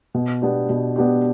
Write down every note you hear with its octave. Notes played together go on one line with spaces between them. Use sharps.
B2
B3 D4 G4
B2
B3 D4 G4